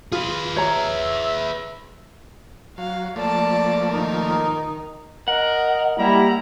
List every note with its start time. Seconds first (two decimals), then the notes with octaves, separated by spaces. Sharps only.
0.12 F4 G#4 B4
0.56 C#5 E5 A#5
2.78 F#3 F5
3.16 F3 A3 A#3 D5 A5
3.90 D#3 D#4 A#4
5.28 A#4 D#5 F#5
5.98 G3 A#3 E4 A#5